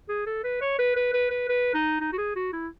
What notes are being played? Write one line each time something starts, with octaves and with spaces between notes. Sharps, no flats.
G#4
A4
B4
C#5
B4
B4
B4
B4
B4
D#4
D#4
F#4
G#4
F#4
E4